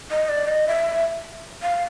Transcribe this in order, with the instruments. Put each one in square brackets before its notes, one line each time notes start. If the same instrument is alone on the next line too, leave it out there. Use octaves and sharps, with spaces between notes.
[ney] D#5
D5
D#5
E5
F5